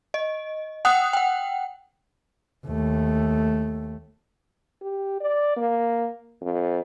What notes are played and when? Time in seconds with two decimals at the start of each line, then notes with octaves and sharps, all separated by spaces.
0.14 D#5
0.85 F#5 G5 D#6 F#6
1.13 F#5 G5
2.67 D#2 A3
4.82 G4
5.20 D5
5.56 A#3
6.42 F2